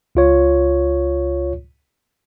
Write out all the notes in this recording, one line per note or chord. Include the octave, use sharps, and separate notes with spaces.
C#2 F4 C#5